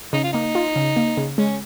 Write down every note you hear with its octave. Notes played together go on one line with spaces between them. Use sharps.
C#3 D#4
F4
A#3 D#4
F4
C#3
A#3
C#3
G#3 C#4